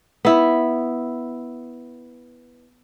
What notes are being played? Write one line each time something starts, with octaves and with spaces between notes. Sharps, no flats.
B3 E4